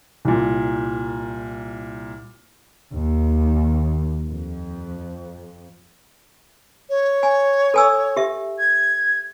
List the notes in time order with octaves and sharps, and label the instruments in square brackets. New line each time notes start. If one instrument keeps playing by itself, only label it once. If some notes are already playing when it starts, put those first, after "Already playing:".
[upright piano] C2 A#2
[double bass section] D#2
F2
[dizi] C#5
[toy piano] G#5
A4 G#5 E6
G4 E5
[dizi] G#6